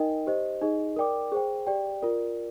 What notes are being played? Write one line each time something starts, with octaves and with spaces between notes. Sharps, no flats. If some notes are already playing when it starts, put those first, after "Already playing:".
Already playing: D#4 A#4 D#5 G5
G4 C5 D#5
D#4 G#4 D#5
A#4 D5 G5 D6
G#4 C5 G5
G4 D5 G5
F4 A#4 D5